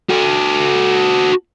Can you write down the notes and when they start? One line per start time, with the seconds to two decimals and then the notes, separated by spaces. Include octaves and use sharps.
0.10 F#4 A4